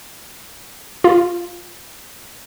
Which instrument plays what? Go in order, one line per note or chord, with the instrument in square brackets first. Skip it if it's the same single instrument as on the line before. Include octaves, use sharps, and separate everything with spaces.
[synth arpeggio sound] F4